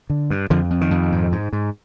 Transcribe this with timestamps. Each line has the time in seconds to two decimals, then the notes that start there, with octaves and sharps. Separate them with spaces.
0.10 D3
0.30 G2
0.50 F2 D3 F3
0.70 F2
0.81 D#3
0.91 F2
1.12 G#2
1.32 G#2
1.53 G#2